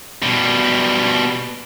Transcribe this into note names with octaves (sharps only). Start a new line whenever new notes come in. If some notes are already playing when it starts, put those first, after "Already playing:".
B2 G3